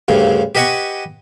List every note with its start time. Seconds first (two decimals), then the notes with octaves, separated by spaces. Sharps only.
0.08 D2 G2 C#3
0.55 G4 B4 D#5 F#5 G#5 C#6